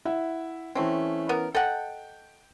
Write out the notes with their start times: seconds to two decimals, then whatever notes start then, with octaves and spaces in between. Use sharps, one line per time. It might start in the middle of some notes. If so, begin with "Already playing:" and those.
0.05 E4 E5 F#5
0.75 E3 A3 C4 C#4
1.29 B3 A#4
1.55 A4 D#5 F#5 G5